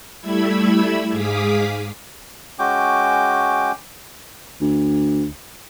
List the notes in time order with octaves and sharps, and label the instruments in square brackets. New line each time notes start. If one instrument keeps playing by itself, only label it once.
[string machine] G3 A3 E4 B5 E6 G#6
G#2 G#4 F5 D6 D#6 B6
[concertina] G#3 C#4 F#4 G5 D6
[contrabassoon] D2